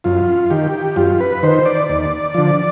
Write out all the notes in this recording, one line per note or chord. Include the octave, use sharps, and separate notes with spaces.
F#2 F4
D#3 G4
F#2 F4
B4
D#3 C5
D5
D#2
D3 F3